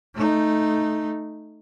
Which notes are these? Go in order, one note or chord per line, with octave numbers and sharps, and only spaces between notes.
A3 D#4